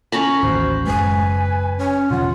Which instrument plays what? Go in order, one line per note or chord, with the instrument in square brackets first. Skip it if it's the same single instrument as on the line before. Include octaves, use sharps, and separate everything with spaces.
[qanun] C#4 A#5 B5
[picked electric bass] A1 D#2 A2 [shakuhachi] F#4 [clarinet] C5
[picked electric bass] F#1 G#3 [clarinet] B4 [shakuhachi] G#5
[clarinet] C#4 [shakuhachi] C#5
[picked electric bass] E1 C#3 F3 [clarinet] F4 [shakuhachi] F#5